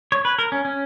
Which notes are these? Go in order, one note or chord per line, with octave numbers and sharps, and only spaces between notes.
C#5
B4
A#4
C#4
C#4